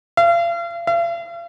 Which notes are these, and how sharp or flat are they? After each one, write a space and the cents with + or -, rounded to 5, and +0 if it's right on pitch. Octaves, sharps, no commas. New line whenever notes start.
F5 -40
F5 -45